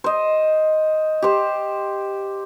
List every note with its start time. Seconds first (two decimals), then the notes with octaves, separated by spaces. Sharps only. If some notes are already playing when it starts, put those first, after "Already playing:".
0.04 C5 D#5
1.22 G4 C5